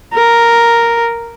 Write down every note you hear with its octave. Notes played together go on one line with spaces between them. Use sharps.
A#4